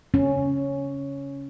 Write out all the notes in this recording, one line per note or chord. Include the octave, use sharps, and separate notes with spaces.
C#4